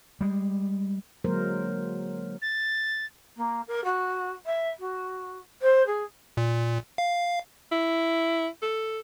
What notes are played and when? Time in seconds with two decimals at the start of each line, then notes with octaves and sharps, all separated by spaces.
0.21 G3 G#3
1.24 D3 F#3 G#3 A#3 A#4 C5
2.42 A6
3.36 A#3
3.67 A#4
3.84 F#4
4.46 E5
4.79 F#4
5.62 C5
5.86 G#4
6.37 A#2
6.98 F5
7.72 E4
8.62 A4